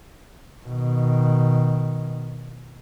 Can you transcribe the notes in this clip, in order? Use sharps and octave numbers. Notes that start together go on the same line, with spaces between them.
B2 D#3